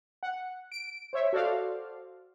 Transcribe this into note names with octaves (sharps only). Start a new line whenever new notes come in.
F#5
D7
C5 C#5 E5
F#4 A4 C5 D5 F5